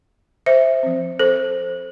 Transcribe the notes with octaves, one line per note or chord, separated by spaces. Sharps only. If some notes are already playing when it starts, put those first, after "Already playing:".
C5 E5
F3 C4
A4 C5